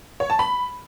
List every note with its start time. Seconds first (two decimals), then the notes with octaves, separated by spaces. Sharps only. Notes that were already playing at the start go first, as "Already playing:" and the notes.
0.20 C#5
0.30 A5
0.39 B5